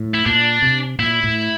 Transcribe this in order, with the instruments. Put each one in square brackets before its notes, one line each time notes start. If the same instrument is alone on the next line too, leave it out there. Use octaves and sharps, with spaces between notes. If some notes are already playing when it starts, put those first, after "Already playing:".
Already playing: [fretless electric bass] A2
[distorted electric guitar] E4
[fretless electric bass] A#2 [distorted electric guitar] D4
[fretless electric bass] C3
[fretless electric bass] A#2 [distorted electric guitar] E4
[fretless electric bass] A2